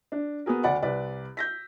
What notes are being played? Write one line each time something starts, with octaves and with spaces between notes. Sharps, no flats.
D4
B3 F#4 G#4 A#4
D2 D5 F#5 B5
C2 B4 D5
G6 A#6 B6